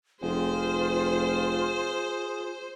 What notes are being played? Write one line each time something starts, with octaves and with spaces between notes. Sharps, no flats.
F1 F4 G#4 C5